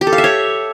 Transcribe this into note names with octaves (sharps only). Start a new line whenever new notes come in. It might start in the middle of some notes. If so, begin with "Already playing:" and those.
G4
A4
F5
E5
C#5